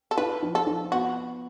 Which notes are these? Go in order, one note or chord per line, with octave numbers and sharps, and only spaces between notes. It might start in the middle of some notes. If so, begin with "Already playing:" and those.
A4
F4 B4
F3
A4
F3
B3 F#4